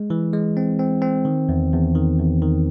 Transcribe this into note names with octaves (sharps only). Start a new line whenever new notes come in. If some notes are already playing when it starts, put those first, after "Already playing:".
Already playing: G#3
E3
G#3
C4
C4
C4
D#3
E2
E2
D#3
E2
D#3